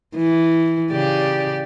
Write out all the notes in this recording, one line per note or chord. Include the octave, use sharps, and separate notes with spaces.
E3
C#3 G4 D5